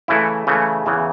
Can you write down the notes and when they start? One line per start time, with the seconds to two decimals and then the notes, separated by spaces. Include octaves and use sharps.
0.08 C#3 E3 A3 E4
0.47 C#3 E3 A3
0.86 E2 C#3 E3